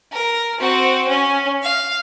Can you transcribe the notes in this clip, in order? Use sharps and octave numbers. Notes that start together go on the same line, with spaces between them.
A#4
C4 F#4
C#4
F5